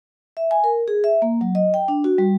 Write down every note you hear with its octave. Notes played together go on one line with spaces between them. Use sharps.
E5
G#5
A#4
G#4
E5
A#3
F#3
D#5
G5
D4
F#4
G3